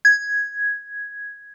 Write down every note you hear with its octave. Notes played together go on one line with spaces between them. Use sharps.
G#6